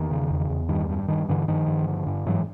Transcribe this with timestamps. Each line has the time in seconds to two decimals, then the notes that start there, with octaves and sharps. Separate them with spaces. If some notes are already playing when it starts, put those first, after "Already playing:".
Already playing: E2 D#3
0.11 C#3
0.30 E2
0.50 E2
0.69 G2 D#3
0.89 G2
1.08 G2 D#3
1.29 G2 D3 E3
1.48 G2 D#3 F3
1.67 G2
1.88 D3
2.06 G2
2.26 G#2 E3 F#3